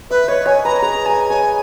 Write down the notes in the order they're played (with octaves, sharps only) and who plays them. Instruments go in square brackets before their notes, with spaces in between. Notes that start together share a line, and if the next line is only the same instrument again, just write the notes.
[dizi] B4 [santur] E5
[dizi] C#5 [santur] D#5
[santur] C#5 [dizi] G#5
[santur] B4 [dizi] A#5
[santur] G#4 [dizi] A#5
[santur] D#5 [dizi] G#5
[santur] C#5 [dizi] G#5